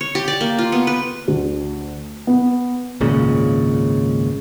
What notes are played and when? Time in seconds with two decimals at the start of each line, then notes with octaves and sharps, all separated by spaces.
0.01 C#5
0.15 G4
0.28 D5
0.41 A#3
0.58 F4
0.72 B3
0.87 B4
1.28 D2
2.27 B3
3.01 G#1 C#2 A#2 C#3